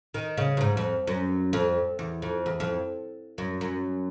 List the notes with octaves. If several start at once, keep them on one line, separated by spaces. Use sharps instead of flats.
D#3
C#3
G2
G#2
F2
F#2
F2
E2
F2
E2
F2
F#2
F#2